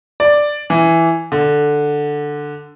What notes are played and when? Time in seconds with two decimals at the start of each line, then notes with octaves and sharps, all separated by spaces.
0.20 D5
0.70 E3
1.32 D3